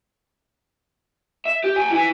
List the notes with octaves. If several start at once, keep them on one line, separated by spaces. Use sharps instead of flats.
E5
G4
G5 G#5
E4 G#5